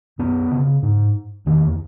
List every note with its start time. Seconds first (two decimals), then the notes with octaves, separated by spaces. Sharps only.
0.19 F#2 B3
0.51 C#3
0.83 G#2
1.46 E2 D#3